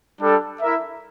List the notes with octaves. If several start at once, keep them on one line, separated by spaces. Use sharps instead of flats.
G3 D4 A4
E4 A#4 E5